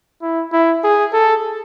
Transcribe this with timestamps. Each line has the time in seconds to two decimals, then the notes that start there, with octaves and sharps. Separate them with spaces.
0.22 E4
0.53 E4
0.84 G#4
1.13 A4